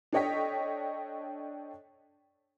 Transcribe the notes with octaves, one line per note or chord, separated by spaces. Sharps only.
D4 A4 C#5 D#5 G5 B6